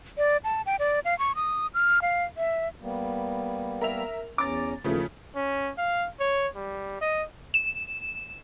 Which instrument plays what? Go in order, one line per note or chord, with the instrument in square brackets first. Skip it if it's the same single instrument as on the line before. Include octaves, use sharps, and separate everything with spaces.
[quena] D5
A5
G5
D5
F5
C#6
D#6
F6
F5
E5
[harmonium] G3 A#3 B3
[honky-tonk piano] A#4 E5 F7
[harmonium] E2 C#4 A#5 [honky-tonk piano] D6 A6
[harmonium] D#2 E3 [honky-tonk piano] C#3 F3 A3
[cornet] C#4
F5
C#5
G3
D#5
[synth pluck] E7